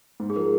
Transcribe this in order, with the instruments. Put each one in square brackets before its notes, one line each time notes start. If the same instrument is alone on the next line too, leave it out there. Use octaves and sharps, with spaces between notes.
[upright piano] G#2
[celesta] G#4
[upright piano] F3 [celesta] A#4